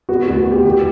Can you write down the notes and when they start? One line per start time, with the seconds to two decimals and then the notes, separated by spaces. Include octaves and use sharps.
0.09 B3 F#4
0.23 D2 F#4
0.37 F#4
0.46 B3
0.51 G4
0.65 E3 G4